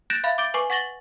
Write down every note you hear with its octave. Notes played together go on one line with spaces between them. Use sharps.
F#6 G6 A6 A#6 D7 E7
E5 F5 B5 A6
D6 G6 A6 D7 G7
B4 G#5 C#6 D6 C7
F#5 C#6 A6 A#6 F#7 G7